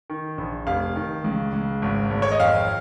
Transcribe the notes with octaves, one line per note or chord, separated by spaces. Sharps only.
D#3
A#1
F1 F5
D#3
C#2
C#2
G#1
G#1
C#5
D#5
F2 F5